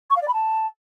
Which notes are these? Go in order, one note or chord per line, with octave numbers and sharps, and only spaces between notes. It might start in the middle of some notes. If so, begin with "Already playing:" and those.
C#6
F5
D5
B5
A5